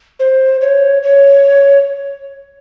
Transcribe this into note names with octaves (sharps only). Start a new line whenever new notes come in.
C5
C#5
C#5